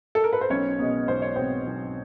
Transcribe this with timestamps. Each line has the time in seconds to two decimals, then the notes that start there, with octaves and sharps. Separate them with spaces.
0.15 A4
0.24 A#4
0.33 B4
0.41 C5
0.50 B1 C#4 C#5
0.79 B2 G#3 B3
1.08 B1 C5
1.22 C#5
1.36 B2 G#3 B3 C4 C5
1.67 B1